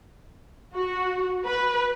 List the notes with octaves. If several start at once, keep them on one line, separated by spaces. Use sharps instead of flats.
F#4
B4